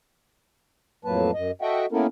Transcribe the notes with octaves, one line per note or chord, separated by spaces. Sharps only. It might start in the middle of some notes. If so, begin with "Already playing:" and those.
F2 A2 F#3 A#3 B4 A5
F#2 D#5
F#4 A4 D#5 E5 F#5 G5
A#3 B3 C#4 E4 A4 A#4